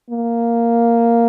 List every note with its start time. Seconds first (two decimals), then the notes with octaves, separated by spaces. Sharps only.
0.10 A#3